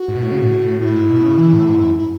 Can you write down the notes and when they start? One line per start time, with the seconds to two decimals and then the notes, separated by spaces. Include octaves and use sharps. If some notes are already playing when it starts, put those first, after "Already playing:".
Already playing: F#4
0.08 G#2
0.16 B2
0.22 A2
0.32 C#3
0.42 A2
0.80 A2 E4
0.95 G#2
1.10 B2
1.24 C#3
1.38 E3
1.53 A2
1.68 G#2
1.81 F#2
1.97 E4